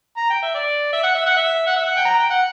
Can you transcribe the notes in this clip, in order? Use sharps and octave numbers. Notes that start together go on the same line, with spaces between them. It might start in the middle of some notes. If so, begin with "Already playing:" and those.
A#5
G5
E5
D5
E5
F#5
E5
F#5
E5
F#5
E5
F#5
G5
A#5
G5
F#5